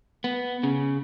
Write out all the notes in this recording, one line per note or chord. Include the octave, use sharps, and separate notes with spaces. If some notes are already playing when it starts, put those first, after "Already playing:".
B3
C#3